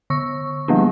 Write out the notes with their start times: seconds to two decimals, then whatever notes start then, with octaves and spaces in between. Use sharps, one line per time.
0.10 D3 C#6 E6
0.68 F3 G3 A#3 B3 D4